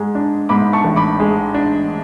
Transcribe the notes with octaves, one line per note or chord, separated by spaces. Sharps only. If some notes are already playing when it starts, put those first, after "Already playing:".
Already playing: G#2 G#3
D4
G#2 B5 D6
A5 C#6
A1
B5 D6
G#3
D4